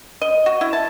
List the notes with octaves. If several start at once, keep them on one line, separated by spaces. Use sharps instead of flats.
D#5
F#4
E4
A5